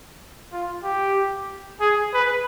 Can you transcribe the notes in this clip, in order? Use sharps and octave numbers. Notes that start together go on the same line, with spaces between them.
F4
G4
G#4
B4